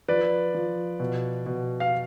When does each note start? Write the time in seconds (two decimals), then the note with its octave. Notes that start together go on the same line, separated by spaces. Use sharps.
0.08 F3 B4 D5
0.54 F3
1.00 B2
1.46 B2
1.80 F5